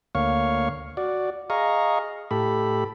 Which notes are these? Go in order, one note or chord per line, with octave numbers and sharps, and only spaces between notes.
D2 A#3 C#5 F5 C#6
F#4 D5
G#4 D#5 F5 A#5 C#6
A2 G4 A4 B5